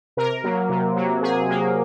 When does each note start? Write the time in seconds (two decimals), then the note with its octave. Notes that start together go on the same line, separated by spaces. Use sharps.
0.17 C3 A#4
0.44 F#3 A#3
0.70 C3
0.96 F#3 A#3
1.22 C3 G#4
1.48 F#3 A#3